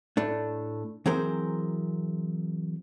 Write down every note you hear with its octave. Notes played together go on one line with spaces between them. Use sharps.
A2 A3 D4
E3 F#3 C4 G#4 A#4 C5